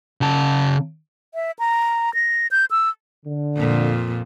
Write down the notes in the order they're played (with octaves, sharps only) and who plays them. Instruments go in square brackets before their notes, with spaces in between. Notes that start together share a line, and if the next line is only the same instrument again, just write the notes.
[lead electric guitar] C#3 A5
[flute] E5
A#5
A#6
G6
E6
[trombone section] D3
[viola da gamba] F2 A#2